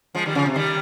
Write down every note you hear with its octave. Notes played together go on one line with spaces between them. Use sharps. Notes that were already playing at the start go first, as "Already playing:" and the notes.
F3 G#3
D#3 G3
C#3 F3
C3
D#3 G3